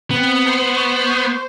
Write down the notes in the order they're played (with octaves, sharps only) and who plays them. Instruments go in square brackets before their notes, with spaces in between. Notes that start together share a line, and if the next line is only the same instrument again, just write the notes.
[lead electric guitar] B3 [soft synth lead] C4
[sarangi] C5
[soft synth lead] C#6